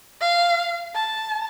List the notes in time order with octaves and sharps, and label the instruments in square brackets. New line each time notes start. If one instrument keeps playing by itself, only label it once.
[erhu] F5
A5